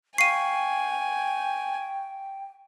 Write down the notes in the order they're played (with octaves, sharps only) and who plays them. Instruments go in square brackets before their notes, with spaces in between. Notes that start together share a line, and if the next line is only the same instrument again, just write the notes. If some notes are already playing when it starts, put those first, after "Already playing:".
[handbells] F5 C#6 [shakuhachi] G5 [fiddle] G#5 [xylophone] C7 D#7